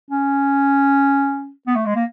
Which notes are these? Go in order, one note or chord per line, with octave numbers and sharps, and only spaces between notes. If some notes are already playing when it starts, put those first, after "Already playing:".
C#4
B3
A3
G#3
A#3